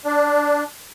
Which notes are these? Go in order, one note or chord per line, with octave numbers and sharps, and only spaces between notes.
D4